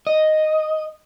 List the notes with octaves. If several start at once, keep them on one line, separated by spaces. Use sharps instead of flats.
D#5